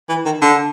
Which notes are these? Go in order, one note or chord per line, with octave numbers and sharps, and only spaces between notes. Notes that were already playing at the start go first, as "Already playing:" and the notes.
E3
D#3
D3